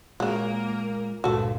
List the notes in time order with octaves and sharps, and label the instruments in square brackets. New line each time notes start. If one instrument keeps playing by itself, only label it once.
[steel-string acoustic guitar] A#2 G#3 [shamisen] C#3 F#4 [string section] A#3 A#4
[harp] G1 A#2 [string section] C#2 [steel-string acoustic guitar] B3 [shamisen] F#4 A4